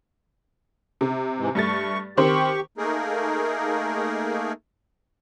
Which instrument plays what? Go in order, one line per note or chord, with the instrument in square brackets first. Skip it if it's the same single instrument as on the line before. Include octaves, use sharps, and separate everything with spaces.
[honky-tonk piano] C3
[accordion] G#2 E3 G#3
[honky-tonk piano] G2 A3 A6 [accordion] C#6
[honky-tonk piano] D#3 C4 C5 [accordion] G4 C#6
[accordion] A3 A#3 D#4 G#4 A#4